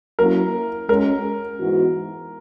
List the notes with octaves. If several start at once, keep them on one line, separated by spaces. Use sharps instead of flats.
F#3 A#3 C#4 E4 A#4
G#3 C#4 F#4 A#4
G#2 E3 B3 F#4